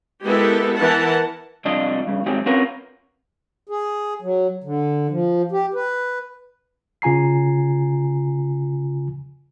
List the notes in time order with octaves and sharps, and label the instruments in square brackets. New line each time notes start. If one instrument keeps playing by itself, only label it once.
[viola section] G#3 B3 E4 G4 A4 A#4
E3 A#4 F#5 A5
[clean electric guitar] C2 F2 D4 F4 D#5
G2 C#3
G#2 D#3 F#3 C4 G4 G#4
C4 C#4 F4 F#4 A#4 B4
[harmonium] G#4
F#3
D3
F3
G4
B4
[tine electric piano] C#3 F4 G#5 A#5 C7